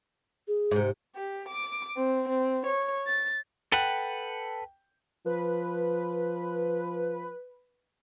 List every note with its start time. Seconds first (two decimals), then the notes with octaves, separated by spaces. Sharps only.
0.48 G#4
0.71 G#2 C3
1.14 G4
1.47 D6
1.97 C4
2.28 C4
2.67 C#5
3.06 A6
3.72 A4 B4 F#5 G5
5.26 F3 B4